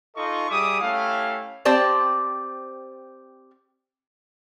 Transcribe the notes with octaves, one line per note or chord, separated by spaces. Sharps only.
D#4 F4 A4 D#5 C6 C#6
G3 G#4 E5 D6 D#6
A3 C#4 E4 G4 F5
C4 G4 C5 D5 A5